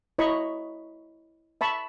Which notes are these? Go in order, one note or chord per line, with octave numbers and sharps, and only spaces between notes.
E4 C#5 D#5 A#5 B5 C#6
E5 A5 B5 C#6